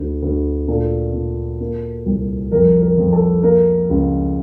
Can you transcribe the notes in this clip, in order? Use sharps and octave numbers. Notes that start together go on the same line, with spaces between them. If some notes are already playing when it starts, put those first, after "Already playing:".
Already playing: D2
D2
A#2 A4
A#2
A#3
C2
F2 A#4
A#4
F2
A4
A#3 A#4
C#2